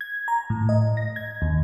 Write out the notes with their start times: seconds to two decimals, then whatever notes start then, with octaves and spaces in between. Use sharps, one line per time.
0.01 G#6
0.28 A#5
0.50 A2
0.69 D#5
0.97 A#6
1.16 G#6
1.42 D#2